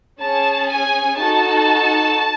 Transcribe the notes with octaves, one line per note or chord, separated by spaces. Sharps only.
C#4 G#4 A5
G#5
D#4 F#4 A4 A5